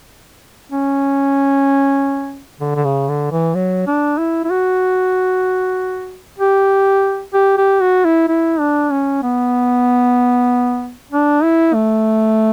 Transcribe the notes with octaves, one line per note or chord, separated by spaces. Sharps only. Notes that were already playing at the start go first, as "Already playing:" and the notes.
C#4
D3
D3
C#3
D3
E3
F#3
D4
E4
E4
F#4
G4
G4
G4
F#4
E4
E4
D4
C#4
B3
D4
E4
A3